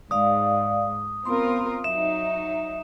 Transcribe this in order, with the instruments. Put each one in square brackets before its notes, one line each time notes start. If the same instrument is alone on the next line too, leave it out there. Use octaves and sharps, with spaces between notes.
[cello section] G#2 [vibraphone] D5 F5 [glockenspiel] D#6
[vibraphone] B3 C6 [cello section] C4 F4 A#4
[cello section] F#3 D#4 [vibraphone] E5 [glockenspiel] E7